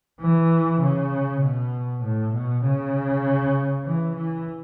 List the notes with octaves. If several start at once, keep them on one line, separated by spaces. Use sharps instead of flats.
E3
C#3
B2
A2
B2
C#3
E3
E3